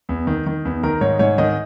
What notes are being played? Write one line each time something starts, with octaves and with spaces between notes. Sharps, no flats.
E2
D#3
D#3
E2
D#3 A#4
G#2 C#5
G#2 C#5
D#3 D#5